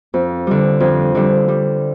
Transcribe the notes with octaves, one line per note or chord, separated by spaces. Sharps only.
F2
D3 G3
F2
D3 G3
G3